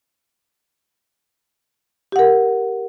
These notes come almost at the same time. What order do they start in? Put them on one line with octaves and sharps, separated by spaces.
G4 F#5 A#4